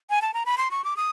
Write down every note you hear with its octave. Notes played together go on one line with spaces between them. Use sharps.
G#5
A5
A#5
B5
C6
C#6
D6
D#6